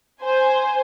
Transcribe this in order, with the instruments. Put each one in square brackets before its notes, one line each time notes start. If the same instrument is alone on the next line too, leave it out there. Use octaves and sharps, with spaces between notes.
[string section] C5 G#5